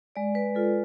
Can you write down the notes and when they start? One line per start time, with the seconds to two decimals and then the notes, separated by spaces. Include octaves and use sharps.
0.16 G#3 D5
0.35 B4
0.55 F4 A4